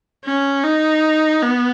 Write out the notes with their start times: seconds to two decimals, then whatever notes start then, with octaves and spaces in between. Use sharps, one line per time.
0.24 C#4
0.64 D#4
1.43 B3